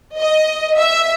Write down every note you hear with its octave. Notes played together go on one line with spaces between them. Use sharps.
D#5
E5